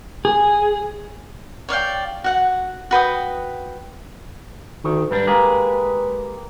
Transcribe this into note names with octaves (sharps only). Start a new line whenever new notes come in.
G#4
C#5 D5 F5 G5
F#4 F#5
F#4 B4 G5 D#6
D2 D#3
G#2 G3 D4 B4
G#3 A#3 G4 G#4